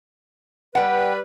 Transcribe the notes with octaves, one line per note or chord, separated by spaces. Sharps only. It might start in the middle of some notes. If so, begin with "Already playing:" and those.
G3 B4 F#5 G5